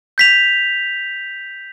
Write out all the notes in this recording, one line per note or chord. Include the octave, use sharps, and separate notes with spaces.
G6 B6 F7